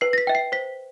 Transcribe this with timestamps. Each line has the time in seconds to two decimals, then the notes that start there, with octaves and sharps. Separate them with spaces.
0.01 B4 C7
0.13 A#6
0.18 B6
0.27 E5 G5
0.35 C7
0.52 C5 B6